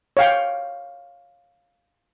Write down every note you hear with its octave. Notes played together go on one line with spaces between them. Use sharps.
C#5 F5 G5